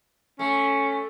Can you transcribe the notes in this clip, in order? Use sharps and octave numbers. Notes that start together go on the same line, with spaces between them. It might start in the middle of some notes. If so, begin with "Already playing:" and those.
A3 C#4